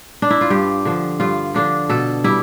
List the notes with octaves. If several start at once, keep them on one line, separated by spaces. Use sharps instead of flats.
D4
E4
F4
G2 G4
D3 F3
G2 F4
D3 F3 D4
B2 A4
G3 E4